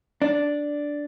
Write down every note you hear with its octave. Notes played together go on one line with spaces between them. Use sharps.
D4